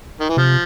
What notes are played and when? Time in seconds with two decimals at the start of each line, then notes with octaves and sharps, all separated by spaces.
0.21 D#3
0.29 E3
0.37 C3 F3